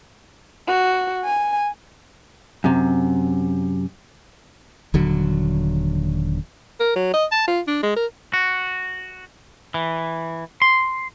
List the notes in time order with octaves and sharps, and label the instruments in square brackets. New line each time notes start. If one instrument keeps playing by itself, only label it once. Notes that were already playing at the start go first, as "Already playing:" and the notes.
[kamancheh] F#4
G#5
[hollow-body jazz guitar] F#2 C3
[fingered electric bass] D#1 D3 F#3
[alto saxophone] A#4
F#3
D#5
A5
F4
D4
G#3
A#4
[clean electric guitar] F#4
E3
C6